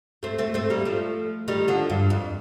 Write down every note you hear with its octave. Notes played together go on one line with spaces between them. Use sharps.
A3 C4
A3 C4
A3 C4
G3 A#3
F3 A3
D#3 G3
D3 F3
G2
F2